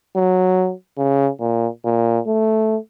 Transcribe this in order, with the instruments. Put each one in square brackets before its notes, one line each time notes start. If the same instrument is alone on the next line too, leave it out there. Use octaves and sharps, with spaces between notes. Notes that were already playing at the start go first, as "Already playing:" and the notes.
[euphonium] F#3
C#3
A#2
A#2
A3